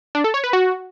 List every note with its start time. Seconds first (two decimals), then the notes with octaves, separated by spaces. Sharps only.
0.15 D4
0.24 A4
0.34 C#5
0.44 B4
0.53 F#4